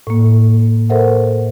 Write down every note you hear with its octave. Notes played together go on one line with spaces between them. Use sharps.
A2 A#3
A4 A#4 C5 E5 F#5